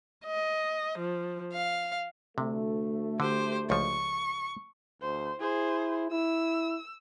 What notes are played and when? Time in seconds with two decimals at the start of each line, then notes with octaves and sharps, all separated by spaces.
0.25 D#5
0.99 F3
1.53 F5
2.38 D2 C3 A3
3.20 D3 G4 C5
3.70 C#2 F3 C#6
5.02 D2 C5
5.40 E4 G#4 C5
6.11 E4 E6